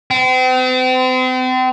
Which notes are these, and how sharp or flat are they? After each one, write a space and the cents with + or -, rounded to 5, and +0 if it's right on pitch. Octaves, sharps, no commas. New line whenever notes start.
C4 -40